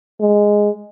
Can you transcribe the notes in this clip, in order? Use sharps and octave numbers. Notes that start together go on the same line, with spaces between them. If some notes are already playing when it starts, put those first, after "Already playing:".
G#3